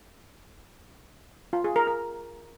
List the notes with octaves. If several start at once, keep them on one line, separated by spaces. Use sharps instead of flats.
F4
G#4
A#4
A#4